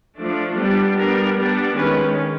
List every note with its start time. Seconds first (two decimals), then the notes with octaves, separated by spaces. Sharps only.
0.18 F3 A3 D4
0.57 G3 B3 D4
0.97 G3 B3 D4 A#4
1.38 G3 B3 D4
1.77 D#3 G#3 C#4 B4